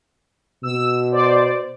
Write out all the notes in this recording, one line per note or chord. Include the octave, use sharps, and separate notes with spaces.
B2 E6
C5 D5